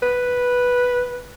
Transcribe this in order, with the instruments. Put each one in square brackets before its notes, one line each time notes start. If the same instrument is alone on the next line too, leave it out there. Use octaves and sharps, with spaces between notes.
[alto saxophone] B4